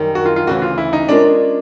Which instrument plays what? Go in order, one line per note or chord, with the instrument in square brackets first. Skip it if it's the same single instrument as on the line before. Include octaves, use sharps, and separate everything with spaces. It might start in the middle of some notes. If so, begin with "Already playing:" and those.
Already playing: [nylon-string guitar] F#2 D#3 G3
[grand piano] F#4
F4
F4
[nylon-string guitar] D2 C#3 E3 [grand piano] F#4
[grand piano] F4
E4
D#4
[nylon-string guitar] G#3 C#4 F4 A#4 D5 [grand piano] D4
[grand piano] D4